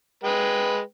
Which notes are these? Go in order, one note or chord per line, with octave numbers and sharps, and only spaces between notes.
G#3 B4 G5